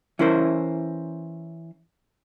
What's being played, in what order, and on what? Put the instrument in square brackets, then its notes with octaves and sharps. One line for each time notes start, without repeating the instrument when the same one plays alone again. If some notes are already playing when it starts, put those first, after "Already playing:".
[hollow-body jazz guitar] E3 C#4 E4 A#4 C5